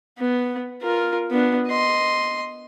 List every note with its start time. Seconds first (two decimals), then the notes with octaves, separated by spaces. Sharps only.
0.19 B3
0.82 F4 A#4
1.31 B3 D4
1.68 D#5 C6